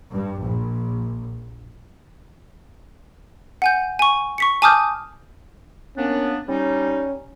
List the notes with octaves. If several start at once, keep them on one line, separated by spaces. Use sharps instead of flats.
G2
A#1
F#5 G#5 G6
G#5 C#6
C#6 B6 C#7
G#5 A5 D6 D#6 F6 G6
A#3 B3 C#4 D4
G3 C#4 D#4